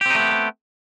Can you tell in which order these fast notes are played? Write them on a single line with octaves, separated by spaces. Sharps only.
G4 C4 D#4 A3 B3